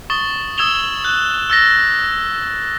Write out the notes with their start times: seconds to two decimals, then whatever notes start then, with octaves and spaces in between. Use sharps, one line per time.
0.10 C#6 D#6 A6 G7
0.58 D#6 E6 G#6 E7 F7 G7
1.04 F#6
1.50 E6 A6 A#6